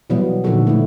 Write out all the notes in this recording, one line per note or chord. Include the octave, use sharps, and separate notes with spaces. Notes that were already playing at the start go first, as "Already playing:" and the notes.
B2 E3 F#3 G3 B3
A#2 D3 D#3 F3 F#4 A4
A3 E4